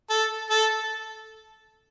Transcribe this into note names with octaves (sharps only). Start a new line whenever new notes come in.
A4
A4